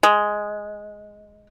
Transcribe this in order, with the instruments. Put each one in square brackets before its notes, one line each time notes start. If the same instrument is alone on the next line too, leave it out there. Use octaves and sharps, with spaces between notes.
[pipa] G#3